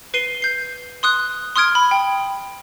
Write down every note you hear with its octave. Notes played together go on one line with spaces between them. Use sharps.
B4 C7 D#7 G7
G6 C7
C6 D#6 F#6
C6 D#6 F6 G#6 D7
B5
G5